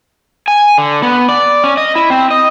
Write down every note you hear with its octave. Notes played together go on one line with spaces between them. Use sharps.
G#5
D3
B3
D5
C#4
D#5
E4
C4
D#5